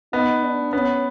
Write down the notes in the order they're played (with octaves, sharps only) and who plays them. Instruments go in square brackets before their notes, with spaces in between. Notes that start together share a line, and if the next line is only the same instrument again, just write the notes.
[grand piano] B3 [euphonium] D#4
[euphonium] D4
[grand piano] B3 [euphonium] C#4